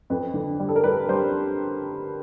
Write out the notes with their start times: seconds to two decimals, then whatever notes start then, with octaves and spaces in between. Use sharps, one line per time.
0.10 F2 B4
0.34 D3
0.60 G3
0.69 A4
0.76 A#4
0.84 G3 B4
1.09 G3 C5